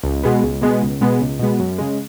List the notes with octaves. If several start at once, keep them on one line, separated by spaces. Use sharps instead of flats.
C#2
B2 G#3 B3
C#2
B2 G#3 B3
C#2
B2 G#3 B3
C#2
B2 G#3 B3
F#2
C#3 G#3